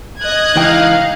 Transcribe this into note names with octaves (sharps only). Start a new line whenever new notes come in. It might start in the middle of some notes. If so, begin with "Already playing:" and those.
D#5 F#6 G#6
C#2 E3 D#4 F5 G5